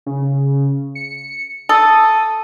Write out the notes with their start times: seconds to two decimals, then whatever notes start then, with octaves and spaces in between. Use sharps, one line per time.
0.06 C#3
0.95 C#7
1.69 A4 D#6